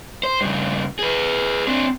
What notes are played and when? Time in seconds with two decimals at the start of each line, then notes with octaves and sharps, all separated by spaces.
0.23 C5
0.41 G2 C#3
0.99 G#4 B4
1.67 C4 D4